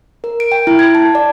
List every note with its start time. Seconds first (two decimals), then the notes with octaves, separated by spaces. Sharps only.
0.24 A#4
0.40 D7
0.52 G5
0.67 E4
0.79 G#6
0.95 A5
1.15 D5